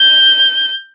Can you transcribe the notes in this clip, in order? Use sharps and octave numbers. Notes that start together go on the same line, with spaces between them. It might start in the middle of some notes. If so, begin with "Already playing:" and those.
Already playing: G6